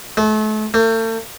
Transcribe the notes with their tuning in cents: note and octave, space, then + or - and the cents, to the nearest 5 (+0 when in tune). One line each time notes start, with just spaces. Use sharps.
A3 -35
A3 +40